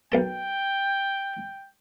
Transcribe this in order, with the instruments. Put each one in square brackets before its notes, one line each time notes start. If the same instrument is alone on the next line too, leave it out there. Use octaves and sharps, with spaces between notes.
[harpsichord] B1 A#4 A5 [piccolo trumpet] G5